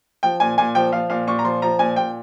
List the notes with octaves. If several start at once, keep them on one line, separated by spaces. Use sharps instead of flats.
F3 G5
A#2 G#5
A#2 G#5
F3 G5
F3 F5
A#2 F5
A#2 C#6
A#5
F3 C6
F3 A#5
A#2 G#5
A#2 G5